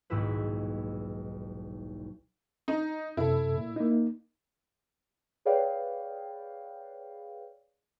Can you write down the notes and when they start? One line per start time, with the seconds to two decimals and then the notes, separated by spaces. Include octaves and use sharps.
0.10 D#1 B1 G#2 E4 B4
2.68 D#4
3.17 F#2 C3 E4 A4
3.58 A#2
3.76 A#3 D#4
5.45 G#4 B4 C#5 D5 F5 G5